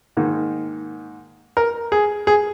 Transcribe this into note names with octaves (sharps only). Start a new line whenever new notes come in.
G#2 D#3 A#3
A#4
G#4
G#4